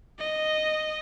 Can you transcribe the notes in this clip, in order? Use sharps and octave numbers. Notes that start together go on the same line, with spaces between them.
D#5